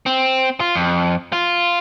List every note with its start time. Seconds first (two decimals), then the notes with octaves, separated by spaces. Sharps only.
0.06 C4
0.60 F4
0.75 F2
1.33 F4